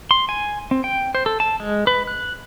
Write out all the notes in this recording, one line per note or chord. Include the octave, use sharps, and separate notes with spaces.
C6
G#5
C4
G5
C5
A4
A5
G#3
B4
F#6